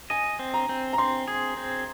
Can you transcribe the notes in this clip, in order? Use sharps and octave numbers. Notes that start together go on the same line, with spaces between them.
D#5 G#5
C4
A#5
C4
A#5
C4 C6
G#4
C4